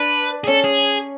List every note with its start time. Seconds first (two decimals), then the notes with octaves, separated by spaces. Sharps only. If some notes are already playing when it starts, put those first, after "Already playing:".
Already playing: D4 B4
0.44 G#4
0.47 C#4 A4
0.64 G#4